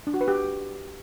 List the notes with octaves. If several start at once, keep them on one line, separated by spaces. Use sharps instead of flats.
D4
F#4
B4
G4